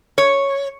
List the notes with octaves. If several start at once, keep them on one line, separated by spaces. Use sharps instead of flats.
C#5